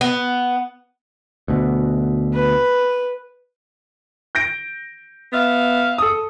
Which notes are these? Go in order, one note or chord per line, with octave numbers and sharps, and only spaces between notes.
B3
D2 B2
B4
G6 A#6 D7
B3 E5 F5
A4 D#6